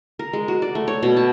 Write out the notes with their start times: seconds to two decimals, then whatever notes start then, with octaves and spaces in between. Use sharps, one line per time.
0.19 A#4
0.33 G#3
0.48 F#4
0.62 D5
0.75 A3
0.88 C#5
1.03 B2
1.17 A5